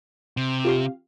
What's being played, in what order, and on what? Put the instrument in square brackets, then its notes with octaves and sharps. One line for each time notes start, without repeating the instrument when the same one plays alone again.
[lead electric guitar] C3
[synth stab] F4 G4 F5